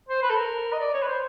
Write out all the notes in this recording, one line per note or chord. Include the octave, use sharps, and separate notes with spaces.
C5
B4
A4
A#4
D#5
D5
C#5
B4
C5